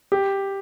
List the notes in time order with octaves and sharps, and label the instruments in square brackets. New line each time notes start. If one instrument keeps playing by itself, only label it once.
[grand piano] G4